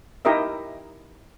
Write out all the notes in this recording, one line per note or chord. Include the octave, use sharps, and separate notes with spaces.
D#4 E4 G4 A#4 D#5 E5